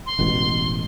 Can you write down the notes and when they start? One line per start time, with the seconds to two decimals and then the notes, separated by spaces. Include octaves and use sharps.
0.06 C6
0.19 E1 A1 B2